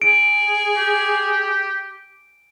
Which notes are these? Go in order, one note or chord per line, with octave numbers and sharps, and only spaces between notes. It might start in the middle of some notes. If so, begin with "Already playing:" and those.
G#4 D7
G4